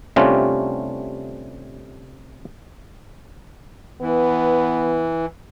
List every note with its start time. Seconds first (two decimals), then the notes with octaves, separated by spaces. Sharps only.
0.16 C3 G3 A3 C#4 D4 F4
4.01 E3 B3